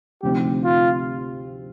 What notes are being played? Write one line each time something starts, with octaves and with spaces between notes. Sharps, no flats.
D2 C3 F3 C4 D#4 G4
F4